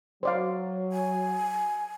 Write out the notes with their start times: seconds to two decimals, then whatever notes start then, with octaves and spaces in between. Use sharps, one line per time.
0.23 F#3 C5 D5 F5
0.92 G#5